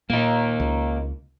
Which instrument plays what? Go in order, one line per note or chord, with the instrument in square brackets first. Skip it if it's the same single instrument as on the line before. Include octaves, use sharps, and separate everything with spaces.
[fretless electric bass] A#2 [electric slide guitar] A#3 D#4
[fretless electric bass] C#2